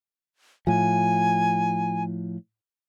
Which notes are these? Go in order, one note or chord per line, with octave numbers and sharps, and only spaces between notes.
A2 F3 G#5